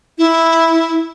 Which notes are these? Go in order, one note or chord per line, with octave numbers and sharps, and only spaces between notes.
E4